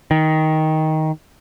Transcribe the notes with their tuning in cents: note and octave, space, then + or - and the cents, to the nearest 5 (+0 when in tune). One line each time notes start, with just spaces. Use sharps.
D#3 +15